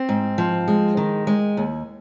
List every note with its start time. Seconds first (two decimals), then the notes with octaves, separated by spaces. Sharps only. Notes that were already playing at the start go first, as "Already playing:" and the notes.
Already playing: C4
0.09 G#2
0.38 F3
0.68 G#3
0.97 D#3
1.27 G#3
1.57 D#2